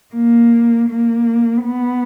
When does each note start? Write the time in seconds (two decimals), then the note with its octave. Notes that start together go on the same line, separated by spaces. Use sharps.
0.15 A#3
0.89 A#3
1.64 B3